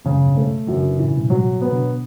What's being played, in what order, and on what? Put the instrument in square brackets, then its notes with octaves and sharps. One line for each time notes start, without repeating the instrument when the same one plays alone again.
[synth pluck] F#2 A2 [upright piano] C#3
[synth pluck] G2 B2
[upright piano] A3
[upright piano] F#2 [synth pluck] C#3 E3
[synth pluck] D3
C#3 E3
[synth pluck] A2 C#3 [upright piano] E3
[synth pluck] G2 B2
A2
[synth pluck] G2 B2 [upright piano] F#3
[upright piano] B3
[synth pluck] B2 D3